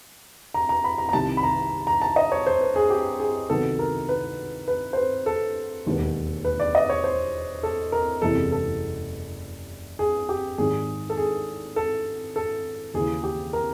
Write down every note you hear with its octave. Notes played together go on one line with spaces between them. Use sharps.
A#5
A#5
B5
A#5
A#5
C2 C3 D#3 A5
B5
A#5
A#5
A5
D#5
C#5
C5
B4
G#4
G4
G#4
C#2 C3 D#3 F#3 B3 A4
A#4
B4
B4
C5
B4
A4
E1 D#2 D#3 G#3 B3
B4
D5
D#5
C#5
C5
A4
A#4
F#1 E2 C3 E3 G#3 A4
A4
G#4
G4
G#1 G#2 D#3 G#4
A4
G#4
A4
A4
D#2 C#3 E3 G#4
G4
A#4